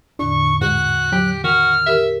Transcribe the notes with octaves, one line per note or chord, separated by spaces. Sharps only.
E2 A2 D3 D4 C#6
G#2 F#4 F#6
F#3 G4
D#3 F#4 F6
G4 A#4 E5